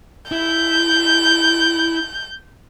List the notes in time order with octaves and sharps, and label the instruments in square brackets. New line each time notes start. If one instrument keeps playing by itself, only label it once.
[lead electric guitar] E4 [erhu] G6